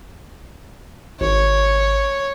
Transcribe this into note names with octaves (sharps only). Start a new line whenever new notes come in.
G#1 C#5